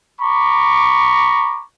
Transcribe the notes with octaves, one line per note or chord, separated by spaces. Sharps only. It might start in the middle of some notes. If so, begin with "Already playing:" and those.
A#5 B5 C#6 D6